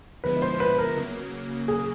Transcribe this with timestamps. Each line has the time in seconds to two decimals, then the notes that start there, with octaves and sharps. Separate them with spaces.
0.24 D3 F3 G#3 B3 E4 B4
0.42 C5
0.60 B4
0.78 A#4
0.96 C#3 F#3 A#3
1.68 G#4